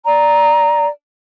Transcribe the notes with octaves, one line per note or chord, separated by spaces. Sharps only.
D5 A#5